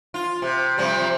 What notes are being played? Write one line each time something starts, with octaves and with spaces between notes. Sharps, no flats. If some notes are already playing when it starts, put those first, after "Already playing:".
F4
C3
C3 F3 G3